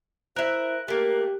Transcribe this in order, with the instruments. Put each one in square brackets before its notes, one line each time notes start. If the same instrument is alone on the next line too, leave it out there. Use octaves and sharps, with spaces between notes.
[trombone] E4 [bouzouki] A#4 E5 [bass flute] C5 [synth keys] F#6
[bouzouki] A3 A#3 [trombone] G4 [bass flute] A#4